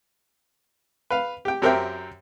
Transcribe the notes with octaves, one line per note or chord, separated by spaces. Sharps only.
B4 F5
G4 G5
F#2 G4 A#4 C5 E5 G5